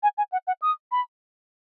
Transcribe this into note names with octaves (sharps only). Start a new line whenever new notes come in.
G#5
G#5
F#5
F#5
D#6
B5